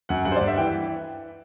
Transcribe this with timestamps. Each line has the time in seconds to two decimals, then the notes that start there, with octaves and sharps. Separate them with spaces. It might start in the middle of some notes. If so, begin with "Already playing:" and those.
0.09 F#2 F#5
0.25 G2 F#5
0.32 C5
0.36 G2 D5
0.47 E5
0.58 E3 G5